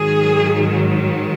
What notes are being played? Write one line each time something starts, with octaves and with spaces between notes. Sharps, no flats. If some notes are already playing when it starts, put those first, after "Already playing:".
Already playing: G#2 D#3 F#3 G#4